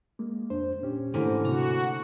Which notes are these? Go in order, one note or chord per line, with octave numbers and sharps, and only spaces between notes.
G#3 A#3
F2 D4 C5
A#2 C#4 G4
G#2 D3 E3 A3 A#3 C5
C3 F#4 A#5